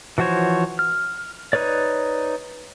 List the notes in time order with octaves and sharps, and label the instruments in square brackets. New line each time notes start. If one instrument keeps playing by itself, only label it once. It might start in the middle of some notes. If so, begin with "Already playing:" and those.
[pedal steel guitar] E3 F3 F#4 C5 C#5
F6
D#4 B4 C#5 D5